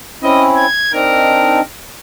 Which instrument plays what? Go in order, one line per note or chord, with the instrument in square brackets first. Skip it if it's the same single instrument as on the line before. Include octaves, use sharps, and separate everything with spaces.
[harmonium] C4 C#4 E4 [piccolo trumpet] D#5
[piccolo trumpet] G#6
[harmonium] C4 D4 D#4 [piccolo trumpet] A#4